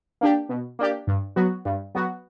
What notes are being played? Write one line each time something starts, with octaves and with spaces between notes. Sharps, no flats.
A#3 D4 G4
B2
A#3 D4 G4
G2
F#3 B3 F#4
G2
F#3 B3 F#4